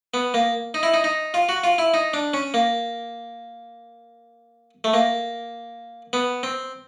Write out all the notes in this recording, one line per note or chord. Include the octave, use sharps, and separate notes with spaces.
B3
A#3
D#4
E4
D#4
D#4
F4
F#4
F4
E4
D#4
D4
C#4
A#3
A3
A#3
B3
C4